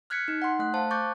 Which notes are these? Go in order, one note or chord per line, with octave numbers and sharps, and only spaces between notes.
F6 F#6 G#6 B6 C#7
D#4
F#5 C6
A3 F#6
C5 F5 A5
C#6 D6 F#6 G6 A6